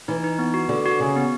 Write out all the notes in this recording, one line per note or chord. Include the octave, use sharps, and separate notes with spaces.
E3 D#4
D#4
B3
F#4
D3 F#4
F#4
C#3 F#4
B3